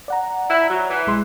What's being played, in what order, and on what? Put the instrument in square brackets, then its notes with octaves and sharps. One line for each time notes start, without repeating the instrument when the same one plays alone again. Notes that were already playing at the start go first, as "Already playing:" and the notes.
[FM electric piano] D5 F#5 A#5
[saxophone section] E4
F#3
E3
[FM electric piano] B1 G#3 C6